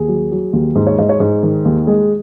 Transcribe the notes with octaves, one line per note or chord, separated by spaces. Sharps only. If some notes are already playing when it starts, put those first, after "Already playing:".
Already playing: D#2 G#4
F#3
F#3
D#2
G#2
C#5
G#2 D#5
C#5
G#2
D#3
D#2
G#3